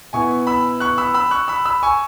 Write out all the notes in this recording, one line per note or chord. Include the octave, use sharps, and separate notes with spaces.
B2 B3 E4 G#5 C#6
B5 E6
C#6 F#6
B5 E6
B5 E6
C#6 F#6
B5 E6
B5 E6
G#5 C#6